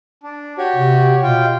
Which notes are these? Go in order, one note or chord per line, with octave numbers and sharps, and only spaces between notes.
D4
F#4 G4 C#5
C3
B2 F4 G5